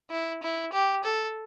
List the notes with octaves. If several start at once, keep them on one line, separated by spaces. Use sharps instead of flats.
E4
E4
G4
A4